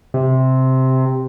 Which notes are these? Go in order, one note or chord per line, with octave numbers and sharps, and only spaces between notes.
C3